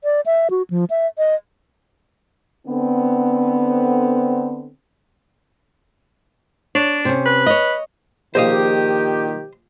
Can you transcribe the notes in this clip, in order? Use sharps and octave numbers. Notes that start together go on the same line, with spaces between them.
D5
E5
F#4
F3
E5
D#5
D3 B3 C4
D4 C#5
C3 C#4
B4
C#5 D#5
A#1 D#3 G4 C5 D#5 F5 D#6